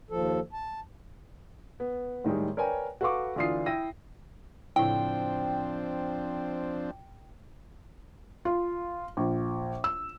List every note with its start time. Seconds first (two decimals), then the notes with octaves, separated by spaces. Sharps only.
0.10 D#2 F3 A4
0.53 A5
1.80 B3
2.24 A2 D#3 G3 G#3
2.57 A#4 B4 C#5 D5 G5 G#5
3.01 F#4 A4 B4 F5 C#6 D6
3.36 D2 E3 D4 F4 D#6 C7
3.66 E4 G5 A#6 D#7
4.76 A2 C#3 F3 C4 D4 E4 G5
8.45 F4
9.17 A#1
9.84 E6